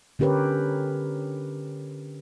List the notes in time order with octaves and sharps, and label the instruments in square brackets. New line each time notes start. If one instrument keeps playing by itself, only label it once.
[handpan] D3 C#4 G4 A#4 B4 C#5